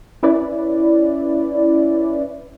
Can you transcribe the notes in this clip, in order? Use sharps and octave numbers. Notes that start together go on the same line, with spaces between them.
C#4 E4 B4 D5